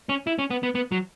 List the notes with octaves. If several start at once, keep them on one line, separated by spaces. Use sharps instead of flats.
C#4
E4
C#4
B3
B3
B3
F#3